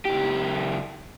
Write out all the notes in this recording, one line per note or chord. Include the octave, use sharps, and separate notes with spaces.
C#2 G4